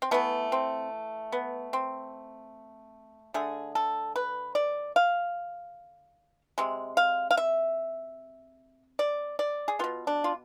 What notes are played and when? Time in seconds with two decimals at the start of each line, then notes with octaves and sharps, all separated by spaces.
0.02 C4
0.11 E3 A3 B3
0.52 C4
1.32 B3
1.73 C4
3.34 D3 A3 G#4
3.75 A4
4.16 B4
4.55 D5
4.96 F5
6.58 C3 G#3
6.97 F5
7.31 F5
7.37 E5
8.99 D5
9.39 D5
9.68 G#4
9.79 B2 B3 F4
10.07 D4
10.24 F4